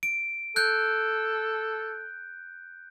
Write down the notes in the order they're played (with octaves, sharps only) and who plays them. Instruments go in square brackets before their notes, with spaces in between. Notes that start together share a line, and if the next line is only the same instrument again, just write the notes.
[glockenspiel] D7
[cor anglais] A4 [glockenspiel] F#6 G6